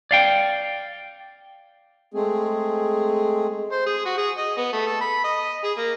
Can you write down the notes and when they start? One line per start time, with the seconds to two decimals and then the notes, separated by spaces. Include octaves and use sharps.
0.11 D5 F5 G5
2.14 G#3 A3 C4 G#4
3.72 C5
3.87 G#4
4.06 F#4
4.18 G#4
4.38 D#5
4.58 B3
4.73 A3
4.87 A4
5.01 B5
5.25 D#5
5.64 G#4
5.78 A#3